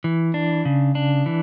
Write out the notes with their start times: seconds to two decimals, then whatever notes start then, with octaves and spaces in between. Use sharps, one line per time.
0.04 E3
0.34 D4
0.65 C#3
0.95 D4
1.26 E3